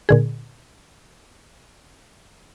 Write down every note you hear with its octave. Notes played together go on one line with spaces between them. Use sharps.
A#2 D3 G#4